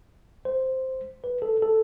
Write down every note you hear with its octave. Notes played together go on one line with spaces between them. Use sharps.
C5
B4
A4
A4